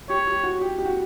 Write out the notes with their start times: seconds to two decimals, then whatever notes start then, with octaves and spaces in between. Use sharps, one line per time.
0.10 G4 C#5
0.27 G4
0.43 F#4
0.61 G4
0.78 G4
0.85 F#4